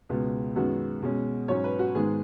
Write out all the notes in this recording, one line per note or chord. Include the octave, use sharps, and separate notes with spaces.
C#2 B2 G#3 B3
F#2 D#3 G#3 B3 F#4
B2 G#3 C#4
G#2 F#3 C#4 C#5
B4
F#4
G#2 D#3 G#3 B3 G#4